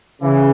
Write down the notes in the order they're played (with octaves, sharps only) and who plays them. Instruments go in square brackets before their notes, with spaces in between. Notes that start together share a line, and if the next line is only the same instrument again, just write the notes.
[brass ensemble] C#3 E3